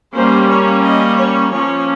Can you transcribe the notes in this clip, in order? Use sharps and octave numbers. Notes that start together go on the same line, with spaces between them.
G3 A#3 C#4 C5
C#5
D#5
C#5
F3 A#3 C#4 C#5